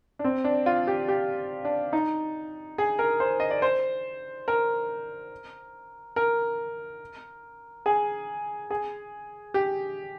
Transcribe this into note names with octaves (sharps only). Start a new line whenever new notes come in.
D4
C4
D4
F4
G4
G4
D4
D#4
G#4
A#4
C5
D#5
D5
C5
A#4
A#4
G#4
G#4
G4